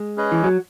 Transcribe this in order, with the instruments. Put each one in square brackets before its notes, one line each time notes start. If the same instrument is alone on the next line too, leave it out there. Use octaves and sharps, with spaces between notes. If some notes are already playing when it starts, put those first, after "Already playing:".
Already playing: [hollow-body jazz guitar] G#3
[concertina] C#4 G#4 B4 D#5
[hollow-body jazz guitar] E3
F#3